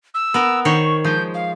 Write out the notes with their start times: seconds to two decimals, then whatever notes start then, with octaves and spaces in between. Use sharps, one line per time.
0.14 E6
0.34 B3 A#4
0.65 D#3 C5 C#5 C#6
1.05 F3 G#3 G6
1.34 F5